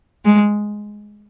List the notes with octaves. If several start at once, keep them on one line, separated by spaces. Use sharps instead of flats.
G#3